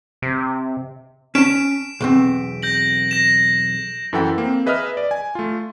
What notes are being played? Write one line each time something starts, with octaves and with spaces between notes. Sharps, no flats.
C3
C#4 A5 B6 D7 E7
B1 E2 C4
G6 A#6 F#7
A#6 E7
F#2 E3 E4 A4 F#5 G5
A#3 C4
G#4 B4 D#5 E5 D#6 F6
D5
G#5
A3 F4